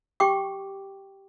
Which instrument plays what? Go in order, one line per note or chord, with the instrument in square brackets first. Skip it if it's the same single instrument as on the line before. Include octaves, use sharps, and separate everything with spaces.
[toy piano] G4 G5 C#6 D6